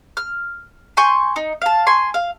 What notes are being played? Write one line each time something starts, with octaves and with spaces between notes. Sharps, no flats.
F6
G#5 C6 C#6 G6
D#4
F5 A5
G#5 C6 C#6
F5